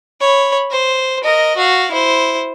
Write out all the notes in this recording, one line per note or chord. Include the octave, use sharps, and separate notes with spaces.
C#5 B5
C5
A#4 D#5
F#4 F5
E4 C5